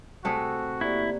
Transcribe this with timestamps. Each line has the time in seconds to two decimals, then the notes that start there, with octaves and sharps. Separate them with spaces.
0.25 C3 A3 F#4 G#4
0.81 A#3 E4 G4 D5